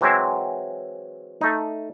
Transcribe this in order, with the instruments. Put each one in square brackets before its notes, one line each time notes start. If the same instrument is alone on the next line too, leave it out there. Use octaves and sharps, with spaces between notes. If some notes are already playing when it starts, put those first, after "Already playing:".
[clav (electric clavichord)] E3 F#3 G#3 C4 E4
A3 D#4